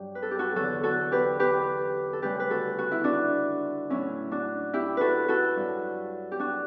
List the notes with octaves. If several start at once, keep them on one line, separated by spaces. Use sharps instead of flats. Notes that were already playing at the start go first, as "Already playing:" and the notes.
Already playing: G2 F#3 G4
B4
A4
G4
F#4 A4
E2 D3 F#3 F#4 A4
F#4 A4
G4 B4
G4 B4
A4
D2 C#3 G3 G4 B4
B4
F#4 A4
F#4
E4
D4 F#4
A2 F#3 C#4 E4
D4 F#4
E4 G4
F#4 A4 B4
F#4 A4
G2 F#3
G4
D4 F#4